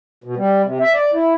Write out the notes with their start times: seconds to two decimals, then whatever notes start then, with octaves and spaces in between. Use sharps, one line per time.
0.24 B2
0.37 G3
0.64 C3
0.81 E5
0.94 D5
1.13 E4